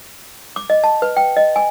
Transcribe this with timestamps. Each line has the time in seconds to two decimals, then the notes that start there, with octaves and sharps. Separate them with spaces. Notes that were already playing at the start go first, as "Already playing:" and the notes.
0.56 D6
0.70 D#5
0.84 A5
1.02 B4
1.17 G5
1.37 D#5
1.56 G#5